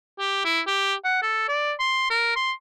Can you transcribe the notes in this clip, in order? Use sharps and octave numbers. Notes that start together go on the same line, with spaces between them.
G4
E4
G4
F#5
A4
D5
C6
A#4
C6